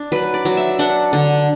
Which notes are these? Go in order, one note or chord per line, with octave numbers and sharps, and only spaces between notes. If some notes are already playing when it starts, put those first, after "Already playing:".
Already playing: D4
F#3 B4
D5
F#3
E5
D4 F#5
D3